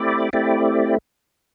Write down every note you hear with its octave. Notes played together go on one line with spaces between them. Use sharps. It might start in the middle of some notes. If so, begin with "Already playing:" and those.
Already playing: A3 C4 E4 G4 D5
A3 C4 E4 G4 D5